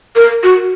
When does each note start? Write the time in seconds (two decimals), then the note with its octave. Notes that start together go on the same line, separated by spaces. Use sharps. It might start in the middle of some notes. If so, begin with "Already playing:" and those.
0.16 A#4
0.43 F#4